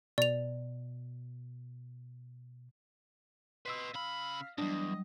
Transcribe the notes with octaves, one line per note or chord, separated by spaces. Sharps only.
B2 D5 F7
B4 D#5 C6 E6 B6
C#3 F5 B5
E2 G#2 F#3 G3 D4 D#5